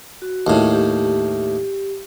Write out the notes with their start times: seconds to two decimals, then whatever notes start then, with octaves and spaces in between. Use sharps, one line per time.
0.22 F#4
0.47 D#2 A2
0.73 G4